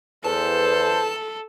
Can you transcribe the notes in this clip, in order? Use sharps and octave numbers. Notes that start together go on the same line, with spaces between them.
E2 A4 C5 A5